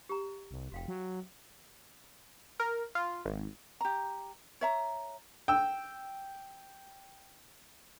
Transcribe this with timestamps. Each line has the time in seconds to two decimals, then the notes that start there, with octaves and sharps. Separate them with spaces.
0.09 G4 A#5
0.51 C2
0.72 F1 F#4 F5 G5
0.88 F#3
2.60 A#4
2.95 F4
3.26 G#1
3.81 G4 A#5
4.61 C#5 E5 A#5
5.48 G5 E6